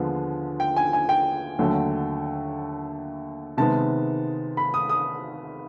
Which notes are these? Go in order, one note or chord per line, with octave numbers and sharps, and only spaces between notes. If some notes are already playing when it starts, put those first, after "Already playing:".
Already playing: D#2 D3 F3 G#3 B3
G5
G#5
G#5
G5
D#2 D3 F#3 A3
C3 D#3 G#3 B3 A5
B5
D#6
D#6